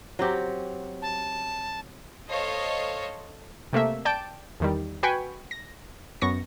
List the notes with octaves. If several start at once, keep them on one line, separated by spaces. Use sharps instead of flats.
F#3 C4 G4
A5
A4 C5 C#5 D#5 F5
C3 A3 A#3 E5
D5 G5 A5 D7
E2 D#3 G3
F#4 B4 G5 G#5 B5 C#6
A#6
F#2 B3 C#6 A#6